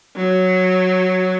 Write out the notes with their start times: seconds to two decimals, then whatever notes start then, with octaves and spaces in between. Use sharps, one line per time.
0.16 F#3